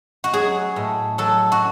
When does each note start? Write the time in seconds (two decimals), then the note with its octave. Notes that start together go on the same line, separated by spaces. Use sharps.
0.24 F#4
0.33 F#3 G#4
0.76 A2
1.18 F#3 A4
1.52 F#4